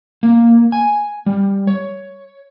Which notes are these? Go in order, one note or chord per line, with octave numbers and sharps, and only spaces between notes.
A#3
G#5
G3
C#5